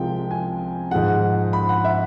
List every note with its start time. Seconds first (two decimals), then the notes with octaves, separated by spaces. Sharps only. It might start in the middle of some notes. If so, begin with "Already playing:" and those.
Already playing: C2 C3 F3 G#3 G5
0.31 G#5
0.91 G#2 F3 G#3 F#5
1.53 B5
1.69 F#5
1.84 E5